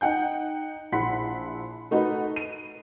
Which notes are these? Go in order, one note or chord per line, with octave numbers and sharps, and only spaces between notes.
D#4 F#5 G5 G6
A#1 E4 F#5 B5 C6 B6
A3 D#4 F#4 B4 D#5
D#7